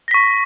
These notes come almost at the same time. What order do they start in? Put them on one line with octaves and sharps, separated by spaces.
A#6 B6 C#6